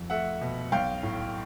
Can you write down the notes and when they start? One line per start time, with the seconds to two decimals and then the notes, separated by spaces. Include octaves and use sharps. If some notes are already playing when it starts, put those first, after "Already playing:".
Already playing: F2
0.10 A3 E5 F#5
0.41 B2
0.72 B1 F5 G5
1.03 A2